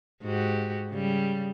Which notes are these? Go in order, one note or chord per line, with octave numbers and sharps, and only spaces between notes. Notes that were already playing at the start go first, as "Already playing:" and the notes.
G#2 F#4 G4
C#3 G3